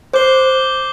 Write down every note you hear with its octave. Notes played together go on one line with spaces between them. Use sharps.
C5 D6 G6 C7 G7